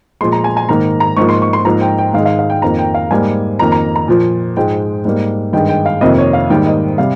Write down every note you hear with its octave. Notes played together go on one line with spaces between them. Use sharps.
A#2 F3 G#3 C6
A#5
G#5
G#5
G#2 D#3 A#3 A#5
A#5
G#2 F3 A#3 C#6
C6
C#6
C6
G#2 F3 A#3 A#5
G5
G5
G#2 D#3 G#3 F5
F5
F5
G5
F2 D#3 A#3 A#5
G5
F5
G#2 G3 A#3 G#5
F2 D#3 A#3 A#5
A#5
A#5
A#2 F3 A#3
G#2 F3 G#3 G5
G#2 G3 A#3
G2 D#3 G#3 G5
G5
F5
F2 C3 D#3 A#3 D#5
C#5
F5
G#2 D#3 G3 A#3 G5
D#5
C3 G3 F5